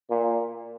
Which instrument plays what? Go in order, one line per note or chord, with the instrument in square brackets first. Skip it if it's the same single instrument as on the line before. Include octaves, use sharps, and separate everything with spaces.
[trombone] A#2